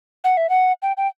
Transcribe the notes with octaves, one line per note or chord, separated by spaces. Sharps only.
F#5
E5
F#5
G5
G5